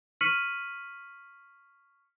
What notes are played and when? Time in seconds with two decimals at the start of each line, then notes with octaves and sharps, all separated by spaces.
0.21 C#6 F6 B6 C#7 D#7 F#7